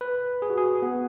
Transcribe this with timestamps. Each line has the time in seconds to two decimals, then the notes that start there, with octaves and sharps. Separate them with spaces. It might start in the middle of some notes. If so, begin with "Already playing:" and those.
0.01 B4
0.42 G#4
0.50 F#4
0.58 G#4
0.82 B3